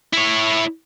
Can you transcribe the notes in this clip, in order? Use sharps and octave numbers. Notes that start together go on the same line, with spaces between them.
E4 C#5